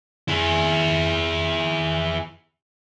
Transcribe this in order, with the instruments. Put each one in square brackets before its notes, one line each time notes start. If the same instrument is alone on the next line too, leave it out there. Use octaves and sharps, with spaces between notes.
[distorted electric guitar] E4 G#4